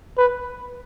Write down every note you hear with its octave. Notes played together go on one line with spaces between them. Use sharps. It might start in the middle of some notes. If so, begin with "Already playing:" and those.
B4